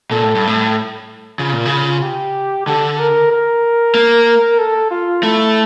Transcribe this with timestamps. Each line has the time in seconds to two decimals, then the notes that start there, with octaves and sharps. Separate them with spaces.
0.11 A#2 A4
0.23 A2
0.35 G2
0.47 A2
1.39 C#3 F4
1.53 A#2
1.66 C#3
1.71 F4
2.02 G4
2.67 D3 A4
2.99 A#4
3.31 A#4
3.95 A#3
4.59 A4
4.90 F4
5.23 A3 E4